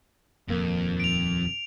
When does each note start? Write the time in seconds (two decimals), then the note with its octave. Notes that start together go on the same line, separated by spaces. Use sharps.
0.49 D#1 F2 A#3
1.00 D7 F7